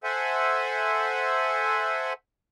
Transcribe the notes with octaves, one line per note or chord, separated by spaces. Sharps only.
A4 C5 E5 F#5 G#5